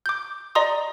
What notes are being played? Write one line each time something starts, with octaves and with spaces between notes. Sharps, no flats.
D6 G6
D5 D#5 A#5 C6 D#6